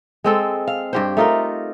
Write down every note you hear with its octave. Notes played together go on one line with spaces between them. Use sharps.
G#3 C4 A4
F5
G2 G4 C5
A3 D#4 F4 A#4